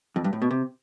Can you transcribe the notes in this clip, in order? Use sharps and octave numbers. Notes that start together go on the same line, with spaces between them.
F2
G2
A2
B2
C3